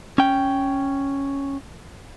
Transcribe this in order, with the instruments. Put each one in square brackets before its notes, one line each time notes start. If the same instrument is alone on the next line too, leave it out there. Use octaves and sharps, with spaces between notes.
[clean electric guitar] C#4 G5